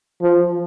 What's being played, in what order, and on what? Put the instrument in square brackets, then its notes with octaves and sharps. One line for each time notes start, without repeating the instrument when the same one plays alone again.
[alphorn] F3